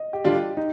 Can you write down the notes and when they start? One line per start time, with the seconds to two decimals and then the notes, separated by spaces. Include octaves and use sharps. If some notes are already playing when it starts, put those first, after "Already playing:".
Already playing: D#5
0.13 G4
0.24 D3 G3 D4 F4
0.57 D#4